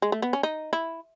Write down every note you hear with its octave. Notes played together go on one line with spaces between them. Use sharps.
G#3
A3
B3
C#4
D#4
E4